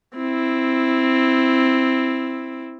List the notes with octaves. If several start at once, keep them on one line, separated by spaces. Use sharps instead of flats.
C4 E4